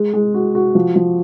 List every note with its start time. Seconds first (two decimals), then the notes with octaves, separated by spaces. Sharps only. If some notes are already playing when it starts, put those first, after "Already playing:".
Already playing: G#3
0.13 G#3
0.34 F#4
0.55 F#4
0.75 F3
0.96 F3